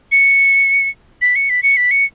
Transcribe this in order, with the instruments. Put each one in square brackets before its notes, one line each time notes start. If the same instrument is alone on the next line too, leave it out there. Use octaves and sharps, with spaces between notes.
[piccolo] C#7
B6
C#7
B6
C#7
B6
C#7